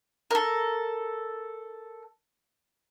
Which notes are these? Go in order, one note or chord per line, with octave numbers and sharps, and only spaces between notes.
A4 A#4